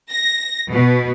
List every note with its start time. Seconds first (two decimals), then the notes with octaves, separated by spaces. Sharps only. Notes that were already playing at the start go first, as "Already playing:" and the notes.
0.11 A#6
0.71 B2